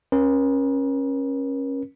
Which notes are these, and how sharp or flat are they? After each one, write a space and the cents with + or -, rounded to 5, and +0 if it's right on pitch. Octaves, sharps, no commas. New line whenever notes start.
C#4 -20 A#4 +40